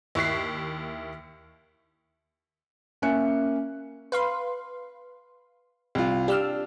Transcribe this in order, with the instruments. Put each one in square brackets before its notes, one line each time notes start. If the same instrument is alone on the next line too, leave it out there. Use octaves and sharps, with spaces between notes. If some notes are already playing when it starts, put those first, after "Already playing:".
[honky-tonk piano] D#2 E4 C#6 F#6 B6 C7
[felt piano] A#3 C#4 E5 G#5 F#6 C#7
[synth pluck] B4 F5 C6
[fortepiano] C2 F4
[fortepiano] D4 [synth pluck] G4 E6 F6